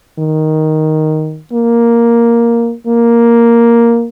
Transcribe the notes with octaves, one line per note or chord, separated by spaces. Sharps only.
D#3
A#3
A#3